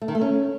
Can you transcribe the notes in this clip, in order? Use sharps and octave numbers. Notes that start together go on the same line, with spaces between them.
A3
D#3
A3
C#4